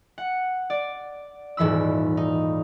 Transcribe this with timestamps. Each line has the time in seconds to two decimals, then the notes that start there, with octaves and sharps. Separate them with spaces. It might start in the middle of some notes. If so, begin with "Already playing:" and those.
0.18 F#5
0.70 D5
1.57 D#1 G#2 E3 B5 E6
2.17 D#4